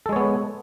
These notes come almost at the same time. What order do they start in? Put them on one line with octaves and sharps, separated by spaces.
A4 G#3 C#5 B3